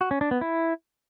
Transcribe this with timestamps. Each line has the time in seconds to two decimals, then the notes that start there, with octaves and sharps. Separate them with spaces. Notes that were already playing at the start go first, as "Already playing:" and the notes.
0.01 F#4
0.11 C#4
0.21 D4
0.31 B3
0.41 E4